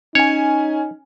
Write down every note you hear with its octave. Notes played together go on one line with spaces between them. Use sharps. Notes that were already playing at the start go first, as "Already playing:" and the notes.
C#4 D#4 C#5 G#5